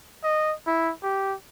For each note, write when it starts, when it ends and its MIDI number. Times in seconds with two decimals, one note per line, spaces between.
0.23 0.54 75
0.67 0.92 64
1.03 1.34 67